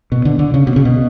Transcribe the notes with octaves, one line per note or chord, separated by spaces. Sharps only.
B2
D3
D3
C#3
B2
C#3
B2